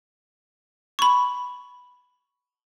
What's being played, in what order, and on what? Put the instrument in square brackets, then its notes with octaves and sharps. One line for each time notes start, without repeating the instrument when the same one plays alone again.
[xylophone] B5 C#6